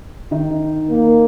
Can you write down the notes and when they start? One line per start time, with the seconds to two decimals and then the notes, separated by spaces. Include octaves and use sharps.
0.31 D#3 D#4
0.90 A#3